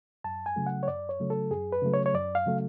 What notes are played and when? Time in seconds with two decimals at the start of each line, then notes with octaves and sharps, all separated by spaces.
0.24 F#2 A5
0.46 G#5
0.56 C#3 F#3 A3
0.66 F#5
0.83 C#5
0.88 F#2 D5
1.09 C#5
1.20 C#3 F#3 A3
1.30 A4
1.51 F#2 G#4
1.72 B4
1.82 C#3 F#3 A3
1.93 C#5
2.06 C#5
2.14 F#2 D5
2.35 F5
2.46 C#3 F#3 A3